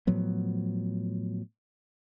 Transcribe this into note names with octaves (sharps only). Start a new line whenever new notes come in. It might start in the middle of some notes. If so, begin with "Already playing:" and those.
A2 F3 F#3 B3